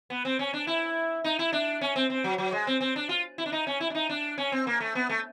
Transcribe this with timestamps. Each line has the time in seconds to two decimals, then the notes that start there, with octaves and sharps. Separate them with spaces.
0.10 B3
0.25 C4
0.39 C#4
0.53 D4
0.67 E4
1.24 D#4
1.39 E4
1.53 D4
1.81 C#4
1.96 C4
2.10 C4
2.24 F#3
2.38 F#3
2.52 G#3
2.67 C4
2.81 C4
2.96 D4
3.09 F4
3.38 E4
3.46 D4
3.52 D#4
3.67 C#4
3.81 E4
3.90 D4
3.95 D#4
4.09 D4
4.38 C#4
4.52 C4
4.67 A#3
4.80 A3
4.95 B3
5.09 A3